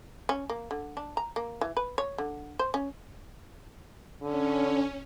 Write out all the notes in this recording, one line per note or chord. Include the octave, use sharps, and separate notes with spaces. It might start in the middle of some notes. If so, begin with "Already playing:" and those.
C#4
A#3
D3
D4
A#5
A#3
E3
B4
C#5
D3
C5
C#4
D3 C#4